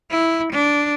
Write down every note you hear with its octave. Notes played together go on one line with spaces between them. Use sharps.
E4
D4